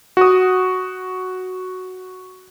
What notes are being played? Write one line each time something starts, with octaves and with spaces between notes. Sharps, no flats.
F#4 D#6